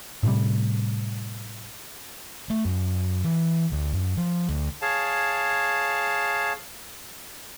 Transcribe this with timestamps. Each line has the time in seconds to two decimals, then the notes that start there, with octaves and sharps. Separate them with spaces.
0.23 A2 C3 G3
2.50 A3
2.65 F#2
3.24 E3
3.72 D2
3.93 F#2
4.17 F3
4.48 D2
4.82 G#4 C#5 F5 A5